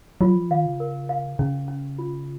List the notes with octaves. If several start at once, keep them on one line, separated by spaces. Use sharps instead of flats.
F#3 F4
F3
D#3 F5
C#3
A#4
F5
C#3 C#4
C#4
F4